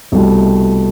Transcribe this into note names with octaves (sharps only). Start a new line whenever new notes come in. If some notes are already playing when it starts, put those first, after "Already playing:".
C2 B2 G3 A3